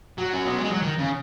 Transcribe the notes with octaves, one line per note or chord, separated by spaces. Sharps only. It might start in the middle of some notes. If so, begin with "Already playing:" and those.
F#3
C#4
B3
G#3
F#3
D#3
C#3